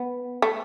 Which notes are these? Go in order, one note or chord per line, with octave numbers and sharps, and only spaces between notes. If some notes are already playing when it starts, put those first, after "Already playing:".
Already playing: B3
A3